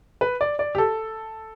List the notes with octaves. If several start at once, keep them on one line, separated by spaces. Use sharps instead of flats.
B4
D5
D5
G4
A4